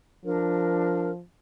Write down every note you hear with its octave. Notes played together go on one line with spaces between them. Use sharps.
F3 D4 A#4